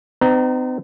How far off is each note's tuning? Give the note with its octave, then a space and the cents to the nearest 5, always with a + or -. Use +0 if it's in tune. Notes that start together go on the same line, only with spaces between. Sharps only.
C4 -45 D#4 -35 A#5 +0